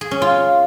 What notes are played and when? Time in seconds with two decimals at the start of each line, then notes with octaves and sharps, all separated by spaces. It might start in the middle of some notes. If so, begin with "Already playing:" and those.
0.01 G#4
0.11 C#4
0.22 F4